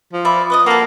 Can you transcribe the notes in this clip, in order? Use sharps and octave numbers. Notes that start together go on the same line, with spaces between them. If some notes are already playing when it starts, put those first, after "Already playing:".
F3
D5 E5 B5
B4 D#5 D#6
A#3 F#4 A4